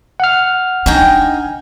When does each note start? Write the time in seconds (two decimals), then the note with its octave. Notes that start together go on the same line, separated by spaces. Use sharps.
0.20 F#5 F6
0.86 D4 D#4 G5 G#5